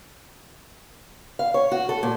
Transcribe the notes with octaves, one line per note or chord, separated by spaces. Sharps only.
F5
C#5
F#4
A4
A#2